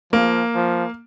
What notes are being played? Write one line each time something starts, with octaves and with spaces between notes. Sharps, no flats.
F3 A#3
F3